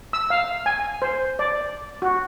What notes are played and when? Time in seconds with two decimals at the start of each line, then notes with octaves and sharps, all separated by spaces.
0.13 E6
0.30 F5
0.66 G#5
1.02 C5
1.39 D5
2.02 F#4